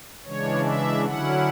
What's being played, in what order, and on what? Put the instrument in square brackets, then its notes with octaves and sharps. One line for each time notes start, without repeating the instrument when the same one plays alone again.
[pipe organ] C#3 E3 G#3 D4 C#5
E5
D3 F#3 C#4 E4 F#5